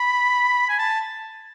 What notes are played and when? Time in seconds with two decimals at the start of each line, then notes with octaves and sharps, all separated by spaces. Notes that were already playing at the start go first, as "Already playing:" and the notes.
Already playing: B5
0.69 G#5
0.79 A5